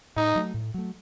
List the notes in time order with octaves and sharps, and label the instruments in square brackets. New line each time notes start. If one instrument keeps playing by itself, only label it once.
[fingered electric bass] A2 [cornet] D#4
[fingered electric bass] F#3 A3
A2
F#3 A3